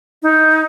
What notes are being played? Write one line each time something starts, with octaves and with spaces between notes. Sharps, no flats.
D#4